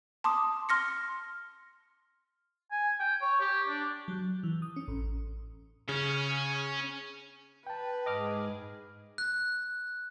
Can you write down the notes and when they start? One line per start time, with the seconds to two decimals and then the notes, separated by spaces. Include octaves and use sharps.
0.24 A5 C6 D6 D#6
0.69 C6 F6 A#6 C#7
2.71 G#5
3.00 G5
3.22 C#5
3.40 G4
3.68 D4
4.08 F#3
4.43 E3
4.62 D#6
4.76 C#4
4.88 A1
5.89 C#3 C#4
7.67 B4 G5 A5
8.06 G#2 G#4 D#5 D6 F6
9.18 F#6